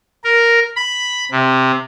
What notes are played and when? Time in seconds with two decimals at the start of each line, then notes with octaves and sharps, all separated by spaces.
0.24 A#4
0.76 B5
1.31 C3